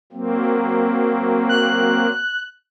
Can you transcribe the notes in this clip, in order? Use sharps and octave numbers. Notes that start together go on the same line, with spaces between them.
F#3 A#3 C4
F#6